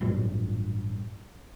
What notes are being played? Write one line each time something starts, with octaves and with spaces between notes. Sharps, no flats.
A1 G2 A#2 F#3